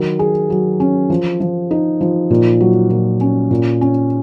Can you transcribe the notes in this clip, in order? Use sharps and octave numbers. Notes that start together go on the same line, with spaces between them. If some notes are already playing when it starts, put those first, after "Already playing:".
Already playing: D#3 F#3 A#4
G#4
F#3
C#4
F3
F3
D#4
F3
A#2
F#3
A#2
C#4
A#2
C#4